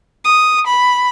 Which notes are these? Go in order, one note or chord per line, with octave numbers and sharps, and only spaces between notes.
D#6
B5